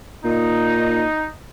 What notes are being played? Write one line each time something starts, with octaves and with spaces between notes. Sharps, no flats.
A#2 D#4